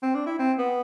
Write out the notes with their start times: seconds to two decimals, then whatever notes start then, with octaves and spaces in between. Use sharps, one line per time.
0.02 C4
0.15 D4
0.26 E4
0.39 C4
0.58 B3